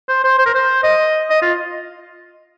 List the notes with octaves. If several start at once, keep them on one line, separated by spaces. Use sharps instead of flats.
C5
C5
C5
A#4
C5
D#5
D#5
F4